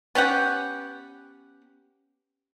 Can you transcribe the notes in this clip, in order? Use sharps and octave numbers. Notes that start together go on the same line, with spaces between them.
B3 C#4 G4 F#5